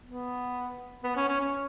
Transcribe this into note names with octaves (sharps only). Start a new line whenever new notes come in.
B3
B3
C#4
C#4
C#4